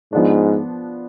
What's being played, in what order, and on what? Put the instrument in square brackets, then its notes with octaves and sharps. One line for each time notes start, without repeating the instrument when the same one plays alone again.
[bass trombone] G#2 [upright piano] F3 B3 D4